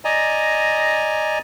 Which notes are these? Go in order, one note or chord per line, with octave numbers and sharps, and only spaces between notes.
D5 D#5 G#5 A#5